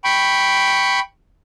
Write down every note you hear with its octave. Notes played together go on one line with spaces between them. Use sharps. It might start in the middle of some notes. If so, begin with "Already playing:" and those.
G5 B5 C#6